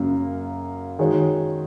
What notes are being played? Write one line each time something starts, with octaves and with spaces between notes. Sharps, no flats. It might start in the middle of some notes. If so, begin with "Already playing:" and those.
Already playing: F#2 C#3 A#3
D#3 G#3 F#4 C#5